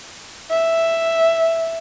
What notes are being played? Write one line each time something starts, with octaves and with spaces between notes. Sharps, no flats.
E5